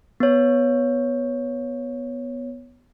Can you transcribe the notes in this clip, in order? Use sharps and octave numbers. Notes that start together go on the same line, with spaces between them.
B3 C#5